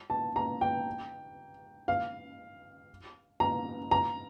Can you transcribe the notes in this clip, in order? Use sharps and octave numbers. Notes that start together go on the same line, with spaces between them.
A5
A#5
G5
F5
A#5
A#5